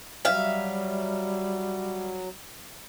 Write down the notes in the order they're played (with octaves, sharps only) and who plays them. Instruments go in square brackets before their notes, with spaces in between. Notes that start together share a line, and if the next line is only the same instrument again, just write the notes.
[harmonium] F#3 [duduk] G3 [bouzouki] E5 F5